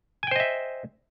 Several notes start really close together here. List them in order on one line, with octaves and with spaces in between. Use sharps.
G#5 G5 C5 D#5 E5